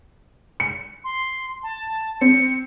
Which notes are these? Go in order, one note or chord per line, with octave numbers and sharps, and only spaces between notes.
C#7
C6
A5
C4 C#7